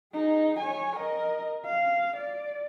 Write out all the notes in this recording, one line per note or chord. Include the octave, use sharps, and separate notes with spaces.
D#4 G#4
C#5 G#5
A#4 D#5
F5
D5